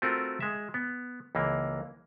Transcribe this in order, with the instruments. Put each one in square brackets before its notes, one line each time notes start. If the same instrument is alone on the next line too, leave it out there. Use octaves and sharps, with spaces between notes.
[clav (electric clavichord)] A3 C4 F4 F#4 A#4
G#3 E5
B3
C#2 E3 A#3